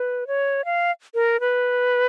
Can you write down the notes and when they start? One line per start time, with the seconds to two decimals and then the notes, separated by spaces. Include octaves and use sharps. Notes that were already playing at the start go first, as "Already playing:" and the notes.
Already playing: B4
0.27 C#5
0.65 F5
1.15 A#4
1.40 B4